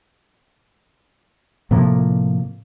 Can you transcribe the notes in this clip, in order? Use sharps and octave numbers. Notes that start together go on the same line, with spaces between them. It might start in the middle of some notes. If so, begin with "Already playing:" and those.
A2 C3 F3 A#3